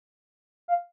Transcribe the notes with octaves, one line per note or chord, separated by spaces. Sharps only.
F5